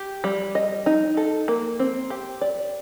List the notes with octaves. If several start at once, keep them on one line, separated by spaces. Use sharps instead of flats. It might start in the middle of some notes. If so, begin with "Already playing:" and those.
Already playing: G4
G3
D#5
D#4
A4
A#3
C4
G4
D5